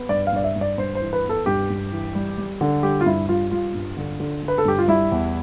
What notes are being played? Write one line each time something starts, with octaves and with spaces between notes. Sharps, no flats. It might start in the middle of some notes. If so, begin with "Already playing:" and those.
Already playing: B3
G2 D5
F5
G2 D5
E5
G2
D5
G2 C5
C5
E3
B4
B3
A4
G2 G4
G2
E3
G3
G3
D3
G3 G4
F4
G2 E4
G3 F4
G3 F4
G2
D3
D3
D3
B4
A4
G2 G4
F4
G3 E4
E2